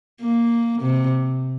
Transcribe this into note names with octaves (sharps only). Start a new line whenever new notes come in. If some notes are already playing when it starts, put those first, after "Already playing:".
A#3
C3